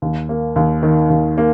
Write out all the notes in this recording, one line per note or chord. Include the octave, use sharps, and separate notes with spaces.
D#2
A#3
D#2
D#3
D#2
A#3